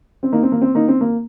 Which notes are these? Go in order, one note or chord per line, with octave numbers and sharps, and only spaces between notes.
C4
A#3 D#4
C4
A#3
C4
A#3 D#4
C4
A#3